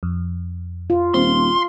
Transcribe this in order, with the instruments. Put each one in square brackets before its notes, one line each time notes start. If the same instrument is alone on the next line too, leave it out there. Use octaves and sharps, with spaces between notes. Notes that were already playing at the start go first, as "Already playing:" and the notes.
[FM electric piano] F2
[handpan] F4
[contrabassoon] D#1 [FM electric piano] C4 [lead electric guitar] C6